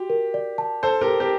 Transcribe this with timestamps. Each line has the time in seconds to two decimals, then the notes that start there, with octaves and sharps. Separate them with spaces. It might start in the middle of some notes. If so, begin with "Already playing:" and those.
Already playing: F#4 G4
0.10 A#4
0.34 D5
0.58 A5
0.83 A4 C5 A5
1.01 G4 A#4
1.07 A4
1.20 G4 A#4